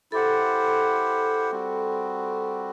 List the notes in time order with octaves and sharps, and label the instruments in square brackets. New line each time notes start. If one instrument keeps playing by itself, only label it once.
[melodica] E4 G4 C5 F#5 [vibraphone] A4
[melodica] G3 C4 F#4